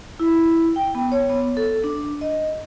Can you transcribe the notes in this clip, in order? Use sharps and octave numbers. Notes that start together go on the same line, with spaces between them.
E4
G5
B3
C#5
B3
A4
D4
D#5